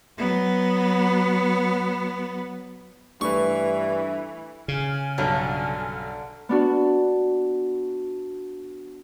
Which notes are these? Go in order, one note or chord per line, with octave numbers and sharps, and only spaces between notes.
F#3 B3
G2 E3 A3 B4 C#6
C#3 G#5 F6
B1 G2 D3 F#3
B3 D4 F#4